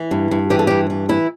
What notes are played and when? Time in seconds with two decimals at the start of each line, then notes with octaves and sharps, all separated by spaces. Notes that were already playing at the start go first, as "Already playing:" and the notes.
Already playing: E3
0.11 G2
0.31 G2
0.50 E3 G4
0.59 A4
0.67 G2 G4
0.90 E3
1.09 E3 E4